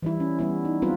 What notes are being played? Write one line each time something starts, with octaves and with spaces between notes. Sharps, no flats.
E3 G3 E4
C#4
G3 B3 E4
D#4
F#3 G3 B3 C4 F4 B4